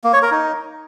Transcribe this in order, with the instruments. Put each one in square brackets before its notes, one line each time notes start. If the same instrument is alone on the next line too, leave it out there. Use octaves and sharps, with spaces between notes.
[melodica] A#3
C#5
A#4
D#4